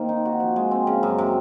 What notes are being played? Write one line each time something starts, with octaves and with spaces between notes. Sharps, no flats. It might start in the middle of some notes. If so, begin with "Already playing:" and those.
Already playing: D#3 A#3 C4
D#4
F#4
F3
G#3
C4
C#3
F#2
C3